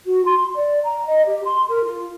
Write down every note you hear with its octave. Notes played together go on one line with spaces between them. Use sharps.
F#4
C6
D5
A#5
D#5
G4
C6
A#4
F4